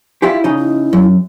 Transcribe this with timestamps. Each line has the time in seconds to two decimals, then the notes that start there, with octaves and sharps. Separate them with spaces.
0.22 E4 F4 G4
0.44 C#3 D#4 D#5
0.58 E4
0.93 F#2